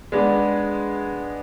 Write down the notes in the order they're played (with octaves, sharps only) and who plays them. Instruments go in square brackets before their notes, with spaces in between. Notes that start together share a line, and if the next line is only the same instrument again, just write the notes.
[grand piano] G#3 B3 D4